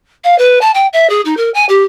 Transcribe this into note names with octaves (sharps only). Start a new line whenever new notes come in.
F5
B4
A5
G5
E5
G#4
D#4
A#4
G#5
G4